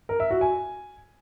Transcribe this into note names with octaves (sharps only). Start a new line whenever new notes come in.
A#4
E5
F#4
G#5